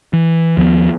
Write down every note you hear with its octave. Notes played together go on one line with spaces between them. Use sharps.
E3
D#2 F3 F#3 B3